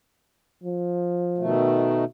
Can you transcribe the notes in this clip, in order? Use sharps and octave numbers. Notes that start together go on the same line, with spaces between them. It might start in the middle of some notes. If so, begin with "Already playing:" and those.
F3
B2 D#3 A3